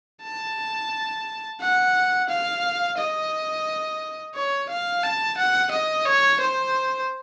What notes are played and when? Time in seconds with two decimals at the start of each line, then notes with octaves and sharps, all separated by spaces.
0.23 A5
1.61 F#5
2.29 F5
2.98 D#5
4.35 C#5
4.69 F5
5.03 A5
5.37 F#5
5.71 D#5
6.06 C#5
6.40 C5